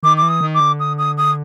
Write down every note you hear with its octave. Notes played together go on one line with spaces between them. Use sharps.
D#3 D6
D6
E3
D#6
D#3
D6
D3
D#6
D#6
D#6